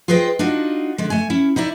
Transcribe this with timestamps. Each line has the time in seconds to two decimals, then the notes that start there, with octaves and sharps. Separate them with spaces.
0.08 F4 G#4 B4 C5 D#5 G5
0.39 D4 D#4 F4 F#4
0.98 D3 G#3
1.10 A3 G#5
1.30 C#4 E4
1.56 D#4 E4 D5 E5